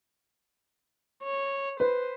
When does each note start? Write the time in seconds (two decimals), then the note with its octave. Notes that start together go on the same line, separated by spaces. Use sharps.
1.23 C#5
1.80 B4 C5